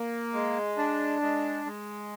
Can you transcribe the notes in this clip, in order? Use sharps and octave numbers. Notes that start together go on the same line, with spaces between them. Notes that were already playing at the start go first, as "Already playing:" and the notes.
Already playing: A#3
G#3
D4
G#3
G#3